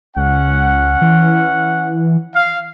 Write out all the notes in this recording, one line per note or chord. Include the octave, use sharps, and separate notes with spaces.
C#2 C#4 F#5
E3
F5